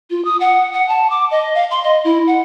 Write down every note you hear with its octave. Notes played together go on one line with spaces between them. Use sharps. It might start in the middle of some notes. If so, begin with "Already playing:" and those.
F4
D#6
F#5
F#5
A5
D6
D#5
F5
C6
D#5
E4
F#5